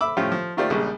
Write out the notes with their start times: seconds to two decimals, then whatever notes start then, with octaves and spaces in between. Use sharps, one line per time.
0.01 E5 B5 D6 E6
0.17 A2 F3 C#4 F4 G4
0.32 F3
0.57 D#3 A3 F4 G4 C5 D5
0.70 A#1 C#3 G3 G#3